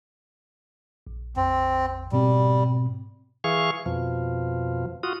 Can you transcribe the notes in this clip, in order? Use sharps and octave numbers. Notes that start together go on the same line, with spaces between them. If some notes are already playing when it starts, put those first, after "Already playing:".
A#1
A#1 F2 C4
G#2 B2 G3 C4
E3 G#4 F5 C#6
F2 B2 F3
F4 F#4 D#6